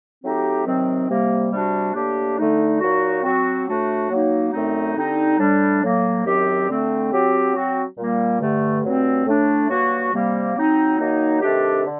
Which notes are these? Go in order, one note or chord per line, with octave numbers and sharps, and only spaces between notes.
F#3 A3 C4 D#4 G4
C3 D#3 F#3 C4
C3 G3 A#3
C3 G3 D4 F#4
A2 G3 A#3 D4 G4
D3 A3 D#4
A#2 F#3 A#3 D#4 F#4
F#3 C4 F#4
A2 A3 D4 F#4
F#3 A#3 D#4
F#2 D3 A3 C4 D#4
D3 G3 C4 D#4
A2 G3 D4
A2 F#3 A#3
F#2 D#3 F#3 C4 G4
D3 A3 C4
F#3 C4 G4
F#3 C4 F#4
A#2 G3 A#3
G2 D3 A3
G2 F#3 A3 C4
A2 A3 D4
G2 F#3 A#3 F#4
C3 G3 A#3
F#3 C4 D#4
D#3 F#3 A#3 D#4
C3 D#3 A3 D4 G4
D3